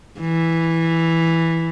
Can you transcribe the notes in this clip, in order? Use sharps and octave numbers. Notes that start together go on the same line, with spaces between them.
E3